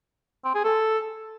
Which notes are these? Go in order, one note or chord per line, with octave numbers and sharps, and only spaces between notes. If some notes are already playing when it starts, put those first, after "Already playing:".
C4
G#4
A4